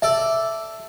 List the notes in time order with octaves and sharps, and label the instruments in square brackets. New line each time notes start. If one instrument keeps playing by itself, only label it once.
[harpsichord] A4 D5 A5 [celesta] E5